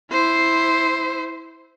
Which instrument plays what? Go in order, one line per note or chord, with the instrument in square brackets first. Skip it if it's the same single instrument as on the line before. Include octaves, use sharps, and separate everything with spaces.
[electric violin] E4 C5